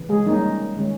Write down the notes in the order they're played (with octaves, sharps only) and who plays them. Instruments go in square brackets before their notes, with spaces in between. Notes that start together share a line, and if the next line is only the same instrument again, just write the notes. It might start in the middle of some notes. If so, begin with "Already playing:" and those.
Already playing: [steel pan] C#3 E3
G#3 G#4
G3 A#3 C#4 D#4
D#3 G#3 C#4